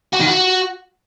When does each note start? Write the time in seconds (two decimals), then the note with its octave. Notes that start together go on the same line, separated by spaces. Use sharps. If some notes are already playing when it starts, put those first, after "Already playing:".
0.13 F#4
0.20 D#3
0.27 F#4